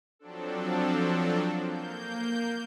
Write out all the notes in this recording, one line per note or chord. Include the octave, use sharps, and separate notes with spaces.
F3 F#3 C4 D4 A4
A#3 G6